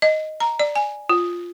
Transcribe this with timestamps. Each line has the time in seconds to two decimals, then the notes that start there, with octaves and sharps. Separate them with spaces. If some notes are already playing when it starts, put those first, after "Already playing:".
0.02 D#5
0.40 A#5
0.60 D5
0.76 G#5
1.09 F4